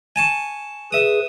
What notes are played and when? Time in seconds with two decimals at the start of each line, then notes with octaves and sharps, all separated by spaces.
0.16 G#5 A5 C#6
0.92 G#4 B4 E5 D#6